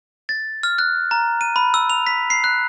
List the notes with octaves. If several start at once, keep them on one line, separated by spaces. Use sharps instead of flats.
A6
F6
F#6
A#5
D#7
B5
E6
F7
B6
C7
F#6